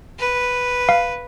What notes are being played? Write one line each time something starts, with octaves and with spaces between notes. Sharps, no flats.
B4
F5